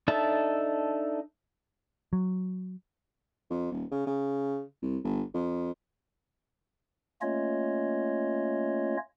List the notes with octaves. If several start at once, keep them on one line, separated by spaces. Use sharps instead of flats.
D4 D#4 A4 E5 A5
F#3
F2
D#1
C#3
C#3
C2
G1
F2
A3 A#3 C#4 F4 C#5 D#5